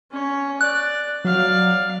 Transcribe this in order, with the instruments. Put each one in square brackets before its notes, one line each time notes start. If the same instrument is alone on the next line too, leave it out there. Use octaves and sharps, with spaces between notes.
[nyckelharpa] C#4 C#5
[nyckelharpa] D5 [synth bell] F#6
[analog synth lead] F#3 [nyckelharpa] D5 F5